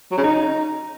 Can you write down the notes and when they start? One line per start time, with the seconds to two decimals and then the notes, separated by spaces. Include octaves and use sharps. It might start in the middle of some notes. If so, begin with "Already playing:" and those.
0.12 F#3
0.18 C#3
0.24 D#4